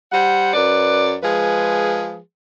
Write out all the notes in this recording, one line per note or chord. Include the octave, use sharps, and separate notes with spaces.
G3 C5 F#5
F#2 B4 D5
F3 G#3 G#4 B4